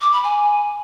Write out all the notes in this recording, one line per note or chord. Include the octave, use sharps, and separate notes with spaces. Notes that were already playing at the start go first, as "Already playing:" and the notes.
D6
B5
G#5